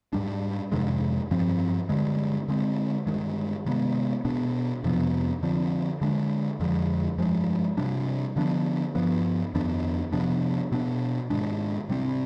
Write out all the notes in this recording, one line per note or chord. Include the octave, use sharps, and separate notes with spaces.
G#2 G3 D4
F2 C3 D#3 G#3
G2 F3 C4
G2 D3 G#3
D3 G#3 C4
G2 D#3 G#3
C3 D#3 G#3 B3
B2 B3 D4
F2 C3 F3 B3
D3 F3 C4
D3 G#3 D4
F2 D3 F3 G#3
G2 F3 G#3
C3 G3 D4
D3 F3 B3 D4
G2 F3 B3
F2 D#3 B3 D4
C3 F3 B3 D4
B2 B3 D4
G#2 D#3 G#3 D4
C3 G3 C4